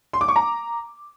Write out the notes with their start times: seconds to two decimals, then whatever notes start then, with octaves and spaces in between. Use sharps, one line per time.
0.13 C6
0.21 D6
0.28 C#6
0.36 A#5